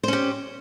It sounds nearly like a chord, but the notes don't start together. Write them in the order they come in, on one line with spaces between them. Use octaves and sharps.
C5 C#4 G4